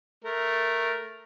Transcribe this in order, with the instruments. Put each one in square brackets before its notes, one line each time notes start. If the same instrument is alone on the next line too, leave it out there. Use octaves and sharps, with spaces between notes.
[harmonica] A3 A#4